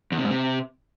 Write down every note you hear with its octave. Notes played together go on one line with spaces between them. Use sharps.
E2
C3
G#2
C3